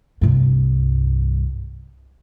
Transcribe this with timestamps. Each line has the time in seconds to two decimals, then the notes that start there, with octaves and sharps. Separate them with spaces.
0.21 C2 G2